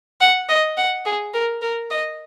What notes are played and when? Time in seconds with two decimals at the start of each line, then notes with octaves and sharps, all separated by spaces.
0.21 F#5
0.49 D#5
0.77 F#5
1.05 G#4
1.34 A#4
1.62 A#4
1.90 D#5